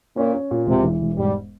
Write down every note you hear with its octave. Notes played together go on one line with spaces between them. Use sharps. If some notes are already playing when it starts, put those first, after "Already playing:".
A#2 C#4
C#4
A#2
E1 C3
E3
E1
G#2 G3